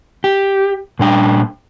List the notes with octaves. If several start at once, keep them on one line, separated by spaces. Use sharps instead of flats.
G4
A#2 G3 D4 G5